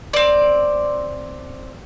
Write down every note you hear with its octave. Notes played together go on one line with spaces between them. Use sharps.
C4 D5